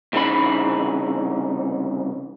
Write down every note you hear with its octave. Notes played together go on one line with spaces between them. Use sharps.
C2 C#3 E3 D#4 B5